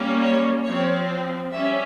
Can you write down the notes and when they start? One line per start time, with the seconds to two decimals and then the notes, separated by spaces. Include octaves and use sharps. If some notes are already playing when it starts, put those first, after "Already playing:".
Already playing: G3 A#3 C#4
0.22 C#5
0.64 F3 C4 C#5
1.51 G3 C#4 E5